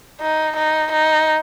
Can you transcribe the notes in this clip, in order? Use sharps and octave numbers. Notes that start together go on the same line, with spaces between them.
D#4
D#4
D#4